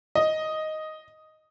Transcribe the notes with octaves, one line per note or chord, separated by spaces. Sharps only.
D#5